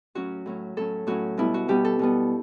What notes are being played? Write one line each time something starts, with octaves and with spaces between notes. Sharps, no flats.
A2 F#3 C#4 F#4
A2 F#3 C#4
A2 F#3 C#4 A4
A2 F#3 C#4 F#4
B2 G3 B3 E4
F#4
B2 G3 B3 G4
A4
B2 G3 B3